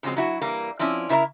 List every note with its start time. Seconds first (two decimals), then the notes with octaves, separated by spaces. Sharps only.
0.03 C#3 F3 F#3 G#3 C4
0.16 F#3 E4 F#4
0.42 E3 G3 A#3
0.79 F3 C4 C#4 E4 D5
1.09 C#3 E4 A#4 C5 E5 A#5